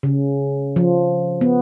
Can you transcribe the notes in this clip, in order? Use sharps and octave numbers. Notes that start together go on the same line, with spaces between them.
C#3
F3
B3